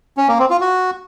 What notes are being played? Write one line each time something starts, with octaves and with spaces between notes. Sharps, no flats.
C#4
A#3
C4
F4
F#4